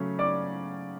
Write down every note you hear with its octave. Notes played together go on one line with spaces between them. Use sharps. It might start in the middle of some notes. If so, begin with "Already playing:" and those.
Already playing: C#3 F#3 A3 C#4
D5 D6